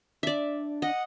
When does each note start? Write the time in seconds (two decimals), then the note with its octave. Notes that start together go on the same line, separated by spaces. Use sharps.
0.23 D4 D5 E5
0.82 D#5 F#5